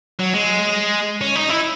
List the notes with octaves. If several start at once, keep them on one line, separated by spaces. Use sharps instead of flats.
F#3
G#3
C#4
D#4
E4